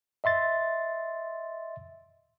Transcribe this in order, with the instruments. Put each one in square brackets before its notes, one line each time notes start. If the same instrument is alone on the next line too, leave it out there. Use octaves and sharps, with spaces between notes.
[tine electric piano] D#5 E5 C6 A6